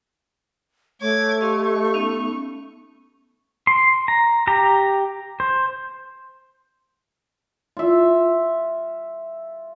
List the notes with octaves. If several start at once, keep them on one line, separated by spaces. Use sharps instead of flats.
A3 C#5 D6 G#6
G4 D#5 F5 C6 C#6
B3 C#4 D#4
C6
A#5
G4 A#5
C5
F4 E5